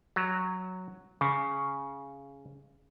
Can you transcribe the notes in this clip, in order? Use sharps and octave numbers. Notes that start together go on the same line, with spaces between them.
F#3
C#3